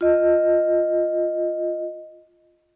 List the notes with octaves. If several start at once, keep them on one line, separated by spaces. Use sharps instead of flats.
F4 D#5